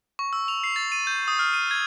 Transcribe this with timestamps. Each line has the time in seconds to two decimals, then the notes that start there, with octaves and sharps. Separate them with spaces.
0.19 C#6
0.33 E6
0.48 F7
0.64 C7
0.76 A6
0.92 D#7
1.07 G6
1.28 D#6
1.39 F6
1.53 D#7
1.71 G#6